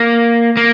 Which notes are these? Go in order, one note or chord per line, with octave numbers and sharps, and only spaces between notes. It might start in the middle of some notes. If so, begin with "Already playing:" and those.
Already playing: A#3
A#3